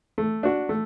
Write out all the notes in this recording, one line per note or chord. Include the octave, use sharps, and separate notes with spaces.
A3
D4 F#4
A3